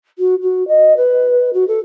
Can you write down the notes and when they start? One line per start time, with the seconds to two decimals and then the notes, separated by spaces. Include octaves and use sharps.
0.18 F#4
0.42 F#4
0.68 D#5
0.96 B4
1.53 F#4
1.67 A4